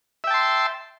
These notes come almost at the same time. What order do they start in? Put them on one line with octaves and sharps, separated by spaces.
E5 G5 A5 C6